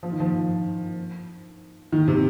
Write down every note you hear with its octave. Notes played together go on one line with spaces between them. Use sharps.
F3
D#3
F3
D#3
C3